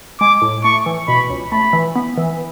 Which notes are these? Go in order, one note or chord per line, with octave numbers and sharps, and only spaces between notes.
G#3 D6
A2
A3 C#6
E3
B2 B5
C#2
A3 B5
E3
B3
E3